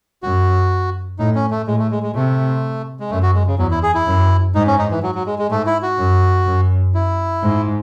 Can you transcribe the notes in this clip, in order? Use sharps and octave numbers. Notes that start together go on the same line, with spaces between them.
F#2 F#4
A2 D#4
C#4
A3
A2 G#3
A3
G#3
G#3
C3 A3
G#3
F#2 A3
F#4
G#3
C#3
E2 F#3
E4
G#4
E4
F#2
G#2 D#4
C#4
D#4
E3
F#3
F#3
G#3
G#3
G#2 A3
E4
F#4
F#2
F#2
E4
G#2